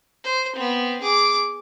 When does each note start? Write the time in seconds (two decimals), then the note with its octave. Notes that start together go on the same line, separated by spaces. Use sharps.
0.24 C5
0.55 B3 C4
1.01 G#4 D6